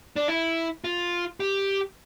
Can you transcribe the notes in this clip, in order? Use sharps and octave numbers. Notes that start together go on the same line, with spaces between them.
D4
E4
F4
G4